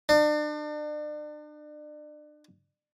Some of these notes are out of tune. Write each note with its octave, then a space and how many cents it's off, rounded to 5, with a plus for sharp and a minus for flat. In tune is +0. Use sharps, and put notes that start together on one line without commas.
D4 +35